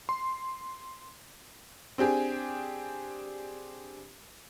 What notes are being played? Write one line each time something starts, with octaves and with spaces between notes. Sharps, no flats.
C6
C4 D4 G4 G#4